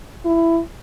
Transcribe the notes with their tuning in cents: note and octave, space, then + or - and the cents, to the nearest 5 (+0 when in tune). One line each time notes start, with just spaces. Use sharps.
E4 +15